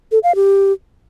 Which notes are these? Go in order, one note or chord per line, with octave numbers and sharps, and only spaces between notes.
A4
F5
G4